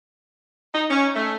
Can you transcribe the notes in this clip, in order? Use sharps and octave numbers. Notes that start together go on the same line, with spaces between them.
D#4
C#4
A3